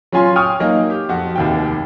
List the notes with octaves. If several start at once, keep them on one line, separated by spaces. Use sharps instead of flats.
F#3 C#4 F4 G#5 C6
G5 G#5 C#6 D#6 F6
F#3 A#3 D#4
G4
F2 F#4
F1 D#2 G5